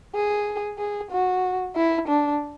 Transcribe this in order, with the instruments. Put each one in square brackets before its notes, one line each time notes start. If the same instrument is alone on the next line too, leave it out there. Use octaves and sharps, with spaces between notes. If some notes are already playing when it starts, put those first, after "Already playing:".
[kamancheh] G#4
G#4
F#4
E4
D4